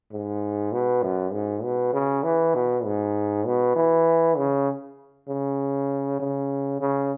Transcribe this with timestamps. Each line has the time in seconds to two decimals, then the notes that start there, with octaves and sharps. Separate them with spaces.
0.12 G#2
0.72 B2
1.03 F#2
1.33 G#2
1.63 B2
1.93 C#3
2.24 E3
2.55 B2
2.85 G#2
3.46 B2
3.76 E3
4.37 C#3
5.28 C#3
6.20 C#3
6.81 C#3